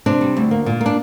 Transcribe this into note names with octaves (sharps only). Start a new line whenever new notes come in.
C3 D4
G3
D2
A#3
A#2
A#3
D4